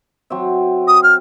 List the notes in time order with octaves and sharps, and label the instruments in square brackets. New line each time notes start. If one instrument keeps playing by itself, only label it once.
[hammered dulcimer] F#3 C4 E5
[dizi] D#6
F6